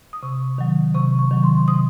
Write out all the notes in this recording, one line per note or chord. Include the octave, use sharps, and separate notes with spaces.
D#6
C3 C#6
D#3 F#3
C3 C#6
C#6
D#3 F#3
C6
C3 D#6